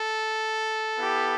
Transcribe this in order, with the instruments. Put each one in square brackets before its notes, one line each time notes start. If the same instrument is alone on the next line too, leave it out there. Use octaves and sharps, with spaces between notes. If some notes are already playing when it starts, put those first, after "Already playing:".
Already playing: [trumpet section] A4
B3 E4 G4